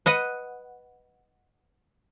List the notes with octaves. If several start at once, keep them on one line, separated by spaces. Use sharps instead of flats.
B4 D#5 F#5